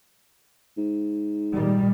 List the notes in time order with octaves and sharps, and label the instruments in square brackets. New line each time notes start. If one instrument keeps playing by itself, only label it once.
[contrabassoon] G#2
[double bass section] A#2 D#3 G3